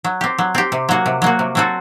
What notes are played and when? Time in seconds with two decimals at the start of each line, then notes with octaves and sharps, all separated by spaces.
0.04 F#3
0.21 C4 G4
0.38 F#3
0.55 C4 G4
0.72 C3
0.89 F#3 A#3 F#4
1.06 C3
1.22 F#3 A#3 F#4
1.39 C3
1.55 F#3 C4 F#4 A4